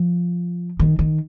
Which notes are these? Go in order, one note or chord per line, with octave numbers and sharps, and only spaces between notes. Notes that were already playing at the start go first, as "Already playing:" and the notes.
Already playing: F3
D#3
D#3